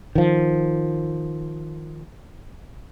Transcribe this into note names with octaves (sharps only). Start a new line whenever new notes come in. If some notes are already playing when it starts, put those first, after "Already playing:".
D#3 F3